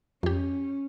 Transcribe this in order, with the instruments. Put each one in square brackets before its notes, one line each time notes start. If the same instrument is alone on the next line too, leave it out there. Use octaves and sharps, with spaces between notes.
[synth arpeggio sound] F2 G4 [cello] C#4